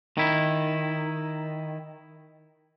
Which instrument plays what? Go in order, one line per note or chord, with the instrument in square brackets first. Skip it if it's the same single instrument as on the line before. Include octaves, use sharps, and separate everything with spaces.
[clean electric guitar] D#3 E4